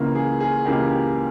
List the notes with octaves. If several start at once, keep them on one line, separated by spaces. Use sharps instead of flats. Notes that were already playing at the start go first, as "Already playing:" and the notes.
Already playing: C#2 C#3 E3 A#3
G#4
G#4
C#2 C#3 E3 A#3 G4
G4